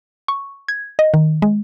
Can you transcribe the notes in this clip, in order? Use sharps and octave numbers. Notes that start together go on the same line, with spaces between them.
C#6
G#6
D#5
D#3
G#3